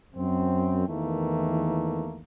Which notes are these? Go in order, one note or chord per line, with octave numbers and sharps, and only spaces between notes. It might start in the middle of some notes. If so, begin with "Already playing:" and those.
F#2 C4
E2 D#3 E3 A3 A#3